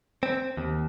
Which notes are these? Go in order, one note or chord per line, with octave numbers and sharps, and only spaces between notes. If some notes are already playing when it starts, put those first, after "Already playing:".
C4
D#2